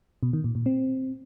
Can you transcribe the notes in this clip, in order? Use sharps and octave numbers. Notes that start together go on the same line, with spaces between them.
B2
D#3
A#2
A#2
C4